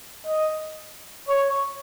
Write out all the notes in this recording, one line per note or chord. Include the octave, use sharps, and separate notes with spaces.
D#5
C#5